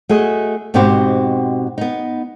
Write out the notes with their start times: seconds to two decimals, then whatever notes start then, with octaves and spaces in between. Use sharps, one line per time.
0.09 A3 F#4 G#4 D#5
0.74 G#2 B2 C4 F#4 G4 C5
1.78 B3 D#4